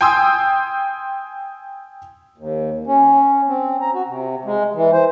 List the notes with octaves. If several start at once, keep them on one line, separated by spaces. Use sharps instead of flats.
G5 G#5 C6 D#6 E6
D#2
C#4
C4
A#5
F#4
C3
G#3
E3
C5